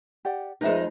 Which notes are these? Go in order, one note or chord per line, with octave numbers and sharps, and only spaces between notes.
G4 D5 F#5
F2 G#3 D#4 A#4 B4 E5